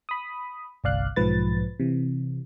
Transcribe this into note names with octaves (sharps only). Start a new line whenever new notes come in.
B5 D#6
G1 C2 D5 F5 F#6
B1 G#2 F3 B4 A6
C3 E3